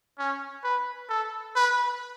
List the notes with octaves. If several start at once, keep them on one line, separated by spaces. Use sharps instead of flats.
C#4
B4
A4
B4